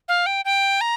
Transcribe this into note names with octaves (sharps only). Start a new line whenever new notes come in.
F5
G5
G5
A#5